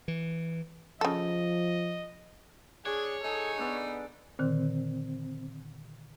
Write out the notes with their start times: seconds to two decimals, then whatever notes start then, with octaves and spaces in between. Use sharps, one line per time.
0.08 E3
1.01 C#3 F3 A4 D#5
2.86 D4 G#4 C#5
3.24 D#4 G#4 A4
3.58 B3 D4 A4 D5
4.39 A#2 D3 D#3 C4